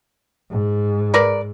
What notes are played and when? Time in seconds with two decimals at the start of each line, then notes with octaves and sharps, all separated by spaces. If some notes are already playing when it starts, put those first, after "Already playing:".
0.51 G#2
1.14 A#4 B4 D5